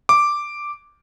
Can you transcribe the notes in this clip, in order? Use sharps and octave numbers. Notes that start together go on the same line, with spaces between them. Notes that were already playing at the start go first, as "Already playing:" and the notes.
D6